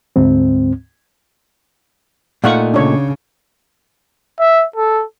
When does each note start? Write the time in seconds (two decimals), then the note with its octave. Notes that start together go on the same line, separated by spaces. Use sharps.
0.16 D2 G#2 C4
2.44 A#2 A3 D#4 F5 F#5 C#6
2.74 C#3 D4 C#5
4.40 E5
4.76 A4